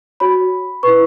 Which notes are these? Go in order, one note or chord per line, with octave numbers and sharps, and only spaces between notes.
F#4 C#5 B5
E4 B4 C#6